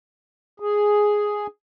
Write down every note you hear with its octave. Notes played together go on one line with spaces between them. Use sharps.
G#4